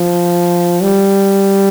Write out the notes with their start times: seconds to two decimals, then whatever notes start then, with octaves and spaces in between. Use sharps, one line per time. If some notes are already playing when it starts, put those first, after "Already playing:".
Already playing: F3
0.81 G3